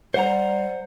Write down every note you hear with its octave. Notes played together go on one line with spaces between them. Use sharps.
G3 C5 F#5 A#5